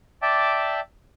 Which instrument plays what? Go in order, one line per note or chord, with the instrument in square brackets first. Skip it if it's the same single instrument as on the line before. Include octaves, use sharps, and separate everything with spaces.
[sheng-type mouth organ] D5 E5 G5 A5 D6